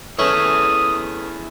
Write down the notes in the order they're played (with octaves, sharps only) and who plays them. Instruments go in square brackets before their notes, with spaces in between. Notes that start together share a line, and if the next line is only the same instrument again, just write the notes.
[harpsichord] A3 C#4 B4 [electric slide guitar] E4 G#4 [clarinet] D#6